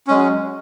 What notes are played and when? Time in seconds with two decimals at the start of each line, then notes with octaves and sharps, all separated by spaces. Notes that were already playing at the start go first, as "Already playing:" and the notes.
0.07 C#4
0.11 G#3
0.14 F#3